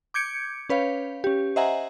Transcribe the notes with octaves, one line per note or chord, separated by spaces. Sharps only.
D6 G6 G#6 C#7 D7
C#4 B4 C#5 F5
C#4 G4
C5 D#5 E5 F#5 G#5 A#5